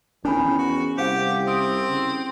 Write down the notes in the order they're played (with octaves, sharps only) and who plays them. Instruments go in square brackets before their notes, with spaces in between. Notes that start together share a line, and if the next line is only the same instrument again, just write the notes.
[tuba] E2 [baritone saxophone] D#3 [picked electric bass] C#4 D4 [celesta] E4 G#5 B5
[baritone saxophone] F#4
[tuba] C2 [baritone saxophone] G4 [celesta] C5 F5 F#5
[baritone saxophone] C4 [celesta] D#6 E6 D7
[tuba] C#3